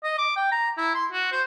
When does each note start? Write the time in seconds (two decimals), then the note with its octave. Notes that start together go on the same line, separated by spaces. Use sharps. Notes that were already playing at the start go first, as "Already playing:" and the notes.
0.04 D#5
0.18 D6
0.36 G5
0.52 A#5
0.78 E4
0.95 C6
1.12 F#4
1.32 C5